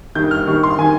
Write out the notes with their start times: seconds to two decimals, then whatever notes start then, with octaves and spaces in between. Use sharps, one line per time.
0.15 G2 D#3 G6
0.31 F6
0.47 G2 D#3 C#6
0.63 C6
0.78 D#3 G#5